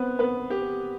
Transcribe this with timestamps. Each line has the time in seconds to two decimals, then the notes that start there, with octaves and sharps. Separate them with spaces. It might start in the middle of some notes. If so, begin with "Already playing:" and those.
Already playing: B3 C4 B4
0.19 B3 B4
0.50 G4